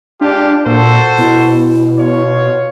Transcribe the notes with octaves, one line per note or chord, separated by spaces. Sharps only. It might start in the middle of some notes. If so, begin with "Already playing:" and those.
G#3 D4 F4 G4
A#2 F#4 A4 C5
B2 E4
F4 C#5